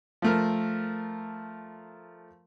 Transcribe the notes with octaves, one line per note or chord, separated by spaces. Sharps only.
F3 A3 A#4